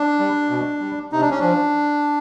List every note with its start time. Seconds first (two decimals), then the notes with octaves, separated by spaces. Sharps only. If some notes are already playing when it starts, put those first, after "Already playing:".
Already playing: D4
0.19 G3
0.50 B2
0.80 G3
1.12 C3 D#4
1.20 D4
1.30 C#4
1.39 F3 D4